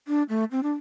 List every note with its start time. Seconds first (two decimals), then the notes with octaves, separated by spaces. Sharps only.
0.08 D4
0.29 A3
0.51 C4
0.63 D4